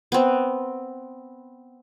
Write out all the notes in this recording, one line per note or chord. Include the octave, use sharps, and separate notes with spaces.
B3 C4